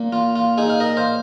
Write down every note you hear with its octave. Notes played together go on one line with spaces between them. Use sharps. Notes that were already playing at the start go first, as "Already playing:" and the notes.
Already playing: A#2 A#3
F4
F4
D#4 G#4
F5
A#4 D#5
C5 F5